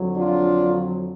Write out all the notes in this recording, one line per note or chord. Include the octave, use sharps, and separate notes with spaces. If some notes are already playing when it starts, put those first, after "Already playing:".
Already playing: F2 D3 F#3
D4 F4